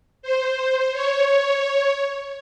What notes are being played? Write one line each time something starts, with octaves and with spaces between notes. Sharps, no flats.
C5
C#5